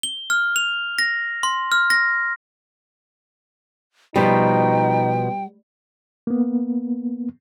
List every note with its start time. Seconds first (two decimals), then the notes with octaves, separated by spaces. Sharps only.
0.03 G7
0.30 F6
0.56 F7
0.99 A#6
1.43 C6
1.72 F6
1.90 A#6
4.16 B2 F3 G3 D#4 G5
6.27 A#3 B3